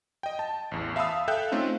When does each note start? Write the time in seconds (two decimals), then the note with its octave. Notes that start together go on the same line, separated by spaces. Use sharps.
0.23 D#5 G5
0.39 A5
0.71 A1 E2
0.96 E5 F5 A5 B5 D#6 E6
1.28 A4 E5 F5 G5 F#6 G6
1.52 A3 C4 C#4 D#4 F4